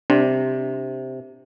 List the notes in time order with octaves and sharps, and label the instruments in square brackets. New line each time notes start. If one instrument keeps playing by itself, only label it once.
[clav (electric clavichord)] C3 [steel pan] D4